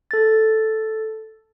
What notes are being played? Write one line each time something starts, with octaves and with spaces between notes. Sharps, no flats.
A4 A6